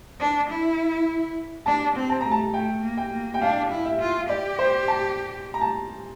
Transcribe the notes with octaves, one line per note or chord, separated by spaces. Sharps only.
D4
E4
D4 A5
C4
A5
A3 A#5
A5
A3 G5
A#3
G5
A#3
G5
D4 F5
E4
E5
F4
G4 D5
C5
A5
A#5
A5